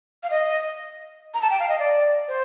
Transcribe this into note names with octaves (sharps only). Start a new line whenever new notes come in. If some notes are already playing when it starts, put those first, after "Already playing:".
F5
D#5
A#5
A5
G5
F5
D#5
D5
C5